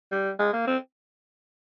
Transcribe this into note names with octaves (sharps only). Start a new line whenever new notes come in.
G3
G#3
A#3
C4